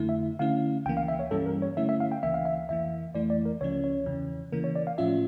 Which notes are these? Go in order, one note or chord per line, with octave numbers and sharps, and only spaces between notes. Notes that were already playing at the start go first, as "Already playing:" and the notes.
Already playing: F2 D3 A3 E4
E5
D3 A3 C#4 E4 F5
C#2 C#3 E3 A#3 G5
F5
E5
C#5
G2 E3 G3 C#4 A4
A#4
C#5
D3 A3 C#4 E4 E5
E5
F5
G5
C#2 C#3 E3 A#3 E5
F5
E5
F2 E3 A#3 E5
F2 E3 A3 E4 D5
D5
A#4
C#2 C#3 F3 C#4 C#5
C#5
E2 C#3 E3
C#3 E3 A#3 A#4
C#5
D5
F5
A2 F3 C#4 F4 E5